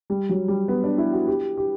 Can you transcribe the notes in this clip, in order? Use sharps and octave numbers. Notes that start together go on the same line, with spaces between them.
G3
F#3
G3
B3
D4
E4
F#4
G4
G4